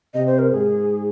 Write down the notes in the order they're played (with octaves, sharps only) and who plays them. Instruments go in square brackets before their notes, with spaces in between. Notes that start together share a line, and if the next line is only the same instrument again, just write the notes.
[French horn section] C3 [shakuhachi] D#5
[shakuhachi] C5
A#4
[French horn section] G#2 [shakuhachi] G#4